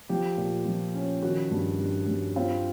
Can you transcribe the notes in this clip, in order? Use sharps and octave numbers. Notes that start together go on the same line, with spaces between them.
F3 G4
A#2
F3
C#4
D#3 F#4
G2
G2
G2
C4 F4